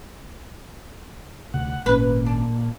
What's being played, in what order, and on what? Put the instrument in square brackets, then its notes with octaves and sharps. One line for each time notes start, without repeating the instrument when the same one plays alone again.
[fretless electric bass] D2 C3 [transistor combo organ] F#5
[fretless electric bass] G#1 C#4 [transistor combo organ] A#2 [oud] B4
[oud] D4